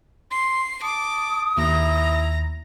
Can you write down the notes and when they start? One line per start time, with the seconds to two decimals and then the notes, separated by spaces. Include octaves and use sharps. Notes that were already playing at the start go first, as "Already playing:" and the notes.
0.31 C6 C7
0.82 A5 D6 D#6
1.57 D#2 E4 A#5